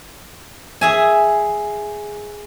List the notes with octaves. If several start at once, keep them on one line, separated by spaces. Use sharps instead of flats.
G#4 E5 G#5